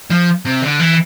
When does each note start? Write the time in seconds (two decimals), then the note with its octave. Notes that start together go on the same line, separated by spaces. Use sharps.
0.10 F3
0.45 C3
0.62 D3
0.79 E3